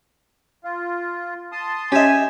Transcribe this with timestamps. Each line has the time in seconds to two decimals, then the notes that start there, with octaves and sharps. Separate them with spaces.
0.64 F4
1.52 A5 C6 D#6
1.92 C#4 G4 D#5 E5 G#5